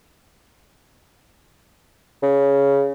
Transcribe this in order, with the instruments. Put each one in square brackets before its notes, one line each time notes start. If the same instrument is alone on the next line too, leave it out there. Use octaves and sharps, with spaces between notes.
[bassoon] C#3